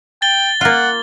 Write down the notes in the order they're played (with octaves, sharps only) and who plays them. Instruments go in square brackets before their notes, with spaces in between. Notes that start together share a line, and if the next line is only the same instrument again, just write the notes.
[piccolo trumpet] G5 [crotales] A6 G7
[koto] A#3 F4 [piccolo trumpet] F#5